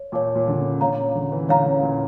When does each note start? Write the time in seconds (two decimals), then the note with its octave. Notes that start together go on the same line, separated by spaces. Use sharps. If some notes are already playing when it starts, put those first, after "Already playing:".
Already playing: C#5
0.12 A#2 C#5 F5 A5 D6
0.35 A#2
0.48 D3
0.58 C#3
0.81 A#2 C#5 F5 A#5
0.98 C#3
1.15 D3
1.32 E3
1.49 D3 C#5 F5 A#5
1.66 C#3
1.83 A#2